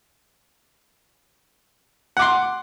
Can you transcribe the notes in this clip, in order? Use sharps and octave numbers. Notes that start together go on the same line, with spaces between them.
F#5 C6 D6